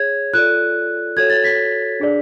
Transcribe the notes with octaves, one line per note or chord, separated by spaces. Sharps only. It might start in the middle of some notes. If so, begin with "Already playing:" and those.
Already playing: G#4 C#5 G#6
F4 A4 D5 F#6
F#4 A4 C#5 G#6
A6
B6
D4 G#4 D5